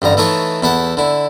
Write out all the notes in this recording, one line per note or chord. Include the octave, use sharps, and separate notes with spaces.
A1 G2 D3 A#5
E3 A3 D#4 F4 A4 C#5
E2 E4 A4 F#5
D3 E4